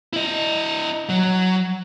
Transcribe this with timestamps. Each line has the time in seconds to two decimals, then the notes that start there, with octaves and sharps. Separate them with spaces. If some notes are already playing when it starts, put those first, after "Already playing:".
0.13 E4 D#5
1.09 F#3